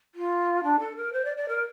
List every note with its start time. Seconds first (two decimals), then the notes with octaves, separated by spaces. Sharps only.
0.14 F4
0.63 D4
0.79 A4
0.96 A#4
1.12 C5
1.24 D5
1.36 D5
1.48 A#4